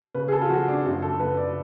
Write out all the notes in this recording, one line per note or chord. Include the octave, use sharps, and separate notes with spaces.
C#3 B4
G#4
A4
F4
F3 F#4
D4
F#1 F#4
A4
F#1 B4
D5